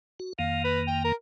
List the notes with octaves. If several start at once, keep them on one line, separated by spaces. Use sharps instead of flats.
F#4
F2 D#3 A#3 F5
B4
G5
A#4